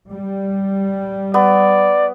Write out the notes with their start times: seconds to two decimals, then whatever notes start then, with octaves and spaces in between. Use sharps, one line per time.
0.12 G3
1.34 B3 D5